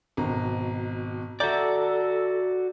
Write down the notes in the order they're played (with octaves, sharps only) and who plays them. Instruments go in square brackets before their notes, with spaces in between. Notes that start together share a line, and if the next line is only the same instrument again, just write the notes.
[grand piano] G#1 B2 A#5
[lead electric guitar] F#4 D5 [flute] A4 [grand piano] E5 A#5 G6